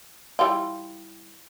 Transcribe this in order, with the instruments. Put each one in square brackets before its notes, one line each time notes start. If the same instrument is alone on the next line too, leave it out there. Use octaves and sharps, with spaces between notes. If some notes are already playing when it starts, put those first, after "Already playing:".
[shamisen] E3 G3 F4